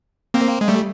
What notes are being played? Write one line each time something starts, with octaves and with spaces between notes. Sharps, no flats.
A#3 C4
G#3
G3 A3